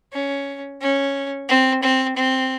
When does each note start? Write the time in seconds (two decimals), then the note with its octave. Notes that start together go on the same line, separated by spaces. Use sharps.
0.13 C#4
0.81 C#4
1.49 C4
1.83 C4
2.16 C4